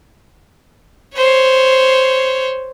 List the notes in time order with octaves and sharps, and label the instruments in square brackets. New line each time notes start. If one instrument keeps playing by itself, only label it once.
[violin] C5 C#5